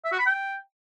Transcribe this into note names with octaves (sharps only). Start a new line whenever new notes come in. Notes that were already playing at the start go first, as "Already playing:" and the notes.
E5
F#4
B5
G5